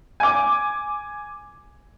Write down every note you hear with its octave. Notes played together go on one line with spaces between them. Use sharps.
G#5 D6